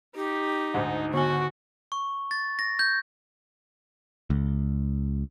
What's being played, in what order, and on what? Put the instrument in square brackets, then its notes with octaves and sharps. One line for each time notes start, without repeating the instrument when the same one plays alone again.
[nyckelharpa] D#4 [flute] G4
[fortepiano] D2 G#2
[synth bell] D3 G#5 [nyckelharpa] F#4 [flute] C#6
[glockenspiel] C#6
A6
A#6
G6
[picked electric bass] C#2